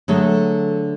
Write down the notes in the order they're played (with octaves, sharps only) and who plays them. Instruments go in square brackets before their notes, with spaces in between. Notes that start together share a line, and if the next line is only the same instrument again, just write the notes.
[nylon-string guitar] D3 F#3 A3 G#4 A4